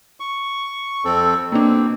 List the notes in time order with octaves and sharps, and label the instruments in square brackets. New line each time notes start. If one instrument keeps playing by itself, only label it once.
[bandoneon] C#6
F2 C4 A4
[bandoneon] B2 C4 [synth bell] A#3 D4